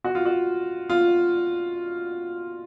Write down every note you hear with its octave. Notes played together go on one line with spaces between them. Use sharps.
F#4
F4
F#4
F4